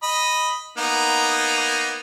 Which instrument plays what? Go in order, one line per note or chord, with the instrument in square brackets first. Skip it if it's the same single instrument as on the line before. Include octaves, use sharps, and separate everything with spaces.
[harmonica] D#5 B5
A#3 B3 D#4